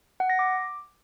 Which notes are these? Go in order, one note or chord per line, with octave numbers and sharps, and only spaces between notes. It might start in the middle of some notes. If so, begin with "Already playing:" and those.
F#5
A#6
D6